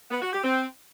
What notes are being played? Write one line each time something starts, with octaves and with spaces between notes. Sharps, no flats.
B3
F#4
G4
C4